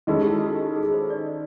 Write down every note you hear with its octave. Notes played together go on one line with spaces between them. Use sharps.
D#3 G#3 C#4 E4 G#4 A4
G4
F#4
G4
G4
G#4
C5
D5